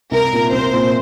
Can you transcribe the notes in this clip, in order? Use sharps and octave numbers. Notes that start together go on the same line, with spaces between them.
C2 A#4
A#2 A#3
C2 C5
A#2 A#3